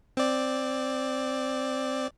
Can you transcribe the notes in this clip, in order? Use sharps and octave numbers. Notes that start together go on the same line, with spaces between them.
C4 D5